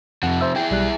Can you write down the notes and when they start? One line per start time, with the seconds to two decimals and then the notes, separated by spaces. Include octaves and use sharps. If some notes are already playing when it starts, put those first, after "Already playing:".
0.23 F2 C3 F3 F#5
0.41 C5 E5 E6
0.56 E4 G#4 G5
0.71 B1 G3 F#6